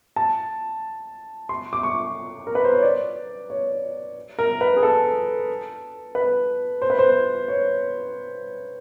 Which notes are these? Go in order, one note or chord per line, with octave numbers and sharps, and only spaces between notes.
A5
C6
D6
C#6
A#4
B4
C5
C#5
D5
C#5
A#4
B4
G#4
A4
B4
C5
B4
C5
C#5